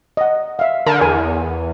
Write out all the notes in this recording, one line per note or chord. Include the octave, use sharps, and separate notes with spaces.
D#5 F#5
E5 F5
D3 A#4
E2 A#4 G#5